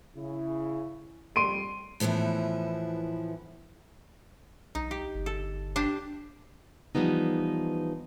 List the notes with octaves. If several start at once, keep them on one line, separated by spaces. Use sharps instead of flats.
C#3 E4
F2 G3 C6 D7 D#7
A2 E3 F3 B3 E4
B1 D#4
G4
G1
A4
D4 G4 C5
E3 F3 G3 B3 D#4